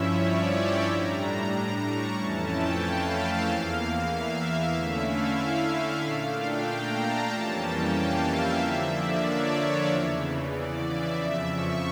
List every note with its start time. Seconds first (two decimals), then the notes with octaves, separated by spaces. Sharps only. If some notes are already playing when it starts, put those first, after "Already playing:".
Already playing: G2 F3 C#4 E4 C#5 E5
0.21 D5
0.54 G5
0.85 A2 G3 D4 A#5
1.83 C#6
2.15 F2 E3 A3 C#4 E4 A5
2.47 G5
2.79 F5
3.12 F5
3.44 E2 E3 A#3
4.09 E5
4.73 D3 A3 C#4 E4
5.05 F5
6.02 A#2 A3 D4 F5
6.34 G5
6.67 A#5
6.99 A5
7.31 F2 E3 G3 A#3 C#4
7.63 G5
7.95 F5
8.27 E5
8.60 D3 F3 A#3 D4
8.93 D5
9.24 C#5
9.89 E2 C#3 E3
10.53 D5
10.85 E5
11.18 F2 C#3 F3
11.50 C#6